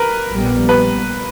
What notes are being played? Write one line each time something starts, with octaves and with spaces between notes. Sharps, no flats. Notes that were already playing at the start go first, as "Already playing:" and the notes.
Already playing: A#4 B4
A#1 A#2 G3 B3
B4